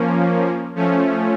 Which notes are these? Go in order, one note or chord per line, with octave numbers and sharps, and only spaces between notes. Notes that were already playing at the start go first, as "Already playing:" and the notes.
Already playing: F3 A#3 C#4
F3 A3 C#4